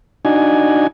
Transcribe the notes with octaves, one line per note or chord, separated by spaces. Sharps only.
D4 D#4 F#4 G#5